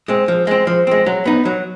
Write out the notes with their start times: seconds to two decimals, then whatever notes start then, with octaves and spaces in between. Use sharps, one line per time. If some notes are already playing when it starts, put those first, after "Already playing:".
0.08 G#3 C4
0.28 F3
0.47 G#3 C4
0.67 F3
0.87 G#3 C4
1.06 F#3
1.25 B3 D#4
1.45 F#3